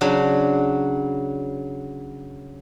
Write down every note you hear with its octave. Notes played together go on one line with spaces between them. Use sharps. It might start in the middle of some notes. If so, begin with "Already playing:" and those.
C#3 F#3 D4